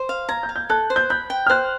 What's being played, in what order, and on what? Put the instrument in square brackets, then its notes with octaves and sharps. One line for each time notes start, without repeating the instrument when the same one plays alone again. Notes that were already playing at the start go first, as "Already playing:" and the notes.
Already playing: [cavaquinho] C5
F5
[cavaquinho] A#5 [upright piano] G#6
[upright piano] G6
[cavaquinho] F5
[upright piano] G6
[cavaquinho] A4 [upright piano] F#6
[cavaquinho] C5
[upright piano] G6
[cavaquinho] B5 [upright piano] G6
[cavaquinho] G5
[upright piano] F6
[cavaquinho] C5 [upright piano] F#6